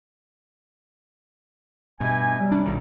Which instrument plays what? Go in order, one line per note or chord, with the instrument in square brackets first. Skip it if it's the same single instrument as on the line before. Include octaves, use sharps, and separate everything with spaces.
[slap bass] G2 B2 [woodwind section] D#5 E5 G#5
[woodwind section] C3 F#3 G3
[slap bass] C#4 D4
B1 A#2 D#3